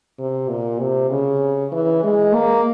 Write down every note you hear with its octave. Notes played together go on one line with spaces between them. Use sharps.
C3
A#2
C3
C#3
E3
G#3
A#3